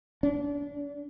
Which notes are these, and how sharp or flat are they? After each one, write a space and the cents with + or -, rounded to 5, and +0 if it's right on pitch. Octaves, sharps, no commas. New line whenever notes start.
D4 -35